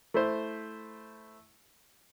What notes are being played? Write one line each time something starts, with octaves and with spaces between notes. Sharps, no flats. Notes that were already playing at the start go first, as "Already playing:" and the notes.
A3 E4 C5